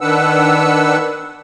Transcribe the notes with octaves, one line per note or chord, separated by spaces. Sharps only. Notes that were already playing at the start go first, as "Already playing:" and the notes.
D#3 D4 B4 F#5 E6